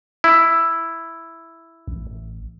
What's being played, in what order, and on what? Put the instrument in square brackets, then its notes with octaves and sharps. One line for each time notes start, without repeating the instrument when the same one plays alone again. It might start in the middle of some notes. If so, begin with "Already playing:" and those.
[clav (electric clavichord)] E4
[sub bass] A1